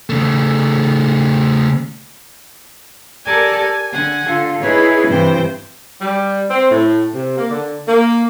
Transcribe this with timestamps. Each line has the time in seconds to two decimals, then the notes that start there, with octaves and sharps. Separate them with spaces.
0.10 C#3 A3
3.24 G4 A4 A#4 D5 G#5 A5
3.57 G#5
3.92 D3 F#5 G#5
4.26 D3 F4 A4
4.61 D#4 E4 G#4 B4 C#5
5.06 G2 C3 E3 C5 G5
6.01 G3
6.51 C4
6.71 A2
7.15 C3
7.38 A#3
7.51 D3
7.88 A#3